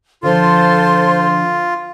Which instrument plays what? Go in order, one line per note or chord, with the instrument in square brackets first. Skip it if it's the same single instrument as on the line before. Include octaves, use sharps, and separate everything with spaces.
[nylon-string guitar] D3 F3 [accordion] F4 [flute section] A4 C5 C6